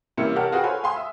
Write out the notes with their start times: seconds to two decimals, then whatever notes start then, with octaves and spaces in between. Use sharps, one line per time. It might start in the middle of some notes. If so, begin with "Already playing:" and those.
0.18 C3 E3 G3 A#3 C#4 C#7
0.36 G4 A#4 C#5 F#5 A5 F6
0.52 F4 F#4 G#4 B4 F#5 G5
0.63 A4 C5 C#5 G#5 B5
0.83 F5 G#5 B5 C6 D#6
0.96 E5